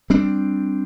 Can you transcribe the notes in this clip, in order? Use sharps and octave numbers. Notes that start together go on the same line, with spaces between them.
G3 C4 D4